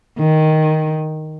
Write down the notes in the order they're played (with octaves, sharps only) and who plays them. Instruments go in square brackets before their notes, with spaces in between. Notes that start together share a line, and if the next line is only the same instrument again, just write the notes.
[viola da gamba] D#3